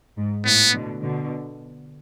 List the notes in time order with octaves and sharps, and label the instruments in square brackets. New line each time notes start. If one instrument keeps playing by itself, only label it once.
[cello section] G#2
[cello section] A2 [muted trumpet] B3
[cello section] B2 D3
B2 D3